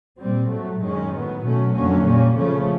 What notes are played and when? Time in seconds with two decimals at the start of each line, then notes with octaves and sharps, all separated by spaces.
0.18 A#2 G3 C4
0.49 A2 F#3 A3
0.80 F#2 D#3 G#3 C#4
1.12 A2 F#3 B3
1.42 B2 F#3 A3 C#4
1.74 F2 D3 F#3 A#3 C#4
2.04 A#2 G3 A#3 C#4
2.36 C#3 F3 A3 C#4